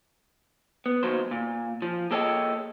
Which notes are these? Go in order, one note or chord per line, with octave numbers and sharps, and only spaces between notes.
B3
D#2 F#3 C5
A#2
F3
A#3 G#4 A4 C#5 D#5 G5